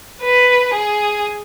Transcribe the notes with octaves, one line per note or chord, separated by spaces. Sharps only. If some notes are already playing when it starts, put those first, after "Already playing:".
B4
G#4